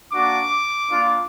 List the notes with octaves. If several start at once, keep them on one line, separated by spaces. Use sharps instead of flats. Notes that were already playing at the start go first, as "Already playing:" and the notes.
A#3 D4 F#4 D6
A#3 D4 F4